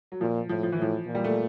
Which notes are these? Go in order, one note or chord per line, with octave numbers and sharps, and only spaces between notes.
F#3
A#2 F3
A2 F3
F3
E3
A2 F3
A#2
G3
A3